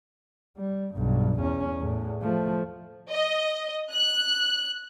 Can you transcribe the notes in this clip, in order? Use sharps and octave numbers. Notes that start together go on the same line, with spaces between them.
G3
B1 G2
E2 C#4
E2 A2
F3 A3
D#5
F#6